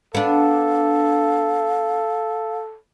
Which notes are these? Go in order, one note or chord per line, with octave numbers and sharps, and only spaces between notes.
B3 D4 A4 F5